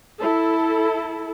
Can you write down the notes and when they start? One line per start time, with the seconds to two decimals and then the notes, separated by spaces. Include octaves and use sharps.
0.20 E4 A4